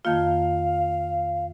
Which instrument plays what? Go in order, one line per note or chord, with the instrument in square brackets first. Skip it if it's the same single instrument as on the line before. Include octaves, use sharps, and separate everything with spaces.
[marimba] F2 D#3 A#3 F4 [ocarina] F5